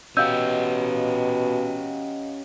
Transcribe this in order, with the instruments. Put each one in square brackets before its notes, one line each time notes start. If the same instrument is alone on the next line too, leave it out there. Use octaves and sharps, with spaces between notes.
[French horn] B2 [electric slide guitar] C#4 G4 [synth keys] D#5 F5 F#5 [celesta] E6 G6